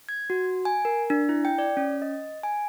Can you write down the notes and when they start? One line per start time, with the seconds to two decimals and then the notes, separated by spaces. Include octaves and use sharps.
0.09 G#6
0.30 F#4
0.65 G#5
0.85 A#4
1.10 D4
1.29 E4
1.45 G5
1.58 D5
1.77 C#4
2.02 D#5
2.43 G#5